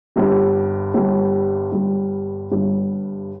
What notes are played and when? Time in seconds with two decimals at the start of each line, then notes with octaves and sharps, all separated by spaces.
0.16 G1 G2 G3
0.94 G1 G2 G3
1.72 G1 G2 G3
2.52 G1 G2 G3